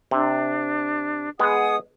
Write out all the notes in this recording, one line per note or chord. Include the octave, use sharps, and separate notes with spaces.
C3 D4
G#3 B3 G#4 F#5 D#6